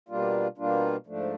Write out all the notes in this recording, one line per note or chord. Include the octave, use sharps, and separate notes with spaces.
B2 G3 A#3 D4 F4
B2 G3 A#3 D4 F4
G#2 F3 A3 D4